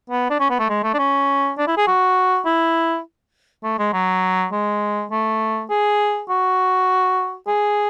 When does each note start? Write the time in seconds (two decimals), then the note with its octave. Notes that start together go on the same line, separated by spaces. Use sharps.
0.10 B3
0.30 D4
0.40 C#4
0.50 B3
0.59 A3
0.69 G#3
0.83 A3
0.94 D4
0.99 C#4
1.58 D4
1.67 E4
1.77 G#4
1.87 F#4
2.46 E4
3.63 A3
3.79 G#3
3.93 F#3
4.52 G#3
5.11 A3
5.70 G#4
6.29 F#4
7.47 G#4